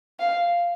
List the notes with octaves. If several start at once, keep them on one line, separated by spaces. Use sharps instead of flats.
F5